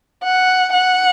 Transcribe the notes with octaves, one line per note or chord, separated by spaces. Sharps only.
F#5
F#5